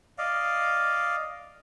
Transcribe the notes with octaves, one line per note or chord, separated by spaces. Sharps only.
D5 D#5 F5